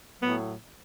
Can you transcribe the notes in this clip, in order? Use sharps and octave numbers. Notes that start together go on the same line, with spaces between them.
A2 F#3 B3